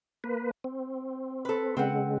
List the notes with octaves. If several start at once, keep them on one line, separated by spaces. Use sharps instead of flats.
A#3 B4
C4
A4 B4
C#3 G#3 C4 B4 F#5